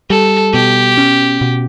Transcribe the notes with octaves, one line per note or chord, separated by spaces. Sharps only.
G3 A4
B2 G4
C#4
B2